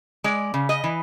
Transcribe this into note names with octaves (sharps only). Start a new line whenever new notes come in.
G#3 D5
C#3
D#5
E3